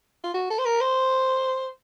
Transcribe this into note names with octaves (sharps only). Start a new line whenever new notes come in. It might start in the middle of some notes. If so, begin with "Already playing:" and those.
F4
F#4
A4
C5
A#4
C5